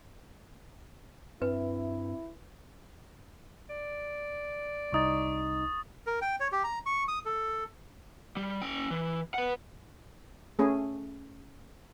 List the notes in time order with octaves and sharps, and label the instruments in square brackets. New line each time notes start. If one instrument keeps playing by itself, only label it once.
[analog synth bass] G2 [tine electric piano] C4 E5 [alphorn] E4 [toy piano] B4
[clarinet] D5
[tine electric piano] C2 D#4 [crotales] C#6 D#6 A6
[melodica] A#4
G5
C#5
G4
A#5
C#6
D#6
A4
[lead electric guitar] G3
C#4 G5
E3
B4 F#5
[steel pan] A3 C#4 G#4